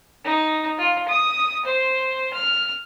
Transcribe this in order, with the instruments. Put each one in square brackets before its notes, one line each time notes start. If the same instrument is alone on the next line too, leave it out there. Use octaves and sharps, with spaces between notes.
[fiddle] D#4
F4
D#6
C5
F6